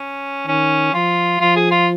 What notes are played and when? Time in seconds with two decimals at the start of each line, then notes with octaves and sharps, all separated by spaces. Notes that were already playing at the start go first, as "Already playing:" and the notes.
Already playing: C#4
0.48 D#3 C#4
0.93 F3 F4
1.41 F3 F4
1.56 G#4
1.71 F4